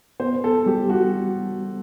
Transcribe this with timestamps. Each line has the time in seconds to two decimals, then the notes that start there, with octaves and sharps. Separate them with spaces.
0.20 B3 C5
0.44 A4
0.66 G3 G4
0.90 F#4